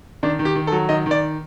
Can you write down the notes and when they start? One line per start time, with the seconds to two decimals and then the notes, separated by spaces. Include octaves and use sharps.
0.23 D#3 D4
0.39 D#3
0.45 G4
0.55 D#3
0.67 A4
0.72 F#3
0.89 D#3 D#5
1.06 D#3
1.11 D5